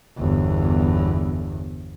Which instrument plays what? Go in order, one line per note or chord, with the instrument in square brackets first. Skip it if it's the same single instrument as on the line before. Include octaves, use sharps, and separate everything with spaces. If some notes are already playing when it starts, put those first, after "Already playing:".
[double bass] G1 E2